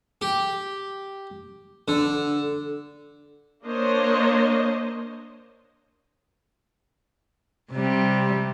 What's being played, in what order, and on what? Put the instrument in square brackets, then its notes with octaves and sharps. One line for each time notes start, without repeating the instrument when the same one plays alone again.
[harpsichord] G4
D3
[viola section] A#3 D4 C5 C#5 D#5
[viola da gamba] C3 G3